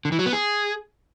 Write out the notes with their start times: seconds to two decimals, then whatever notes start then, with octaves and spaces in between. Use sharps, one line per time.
0.05 D3
0.12 E3
0.19 F#3
0.26 B3
0.33 G#4